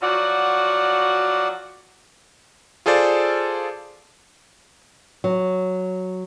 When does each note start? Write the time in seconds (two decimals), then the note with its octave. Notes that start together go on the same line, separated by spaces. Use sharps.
0.02 F3 F#3 F#4 D5 F#5
2.86 F4 G#4 A4 C5 D5
5.24 F#3